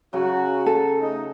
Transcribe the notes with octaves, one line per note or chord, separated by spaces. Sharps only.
C#3 F#3 F#4
A4
A3 D#4